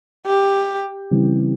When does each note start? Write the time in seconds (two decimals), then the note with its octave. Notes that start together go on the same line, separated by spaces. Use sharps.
0.26 G4
1.11 C#3 E3 G3 C4